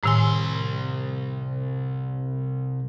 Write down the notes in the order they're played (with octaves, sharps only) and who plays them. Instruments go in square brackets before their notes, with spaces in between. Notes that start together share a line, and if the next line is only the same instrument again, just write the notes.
[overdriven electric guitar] C2 C6 [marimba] A2 D#3 G#5